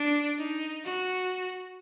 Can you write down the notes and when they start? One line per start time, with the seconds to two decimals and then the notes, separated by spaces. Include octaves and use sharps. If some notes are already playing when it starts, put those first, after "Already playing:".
Already playing: D4
0.38 D#4
0.84 F#4